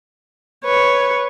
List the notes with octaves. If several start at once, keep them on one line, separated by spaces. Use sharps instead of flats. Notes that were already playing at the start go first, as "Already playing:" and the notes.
B4 C#5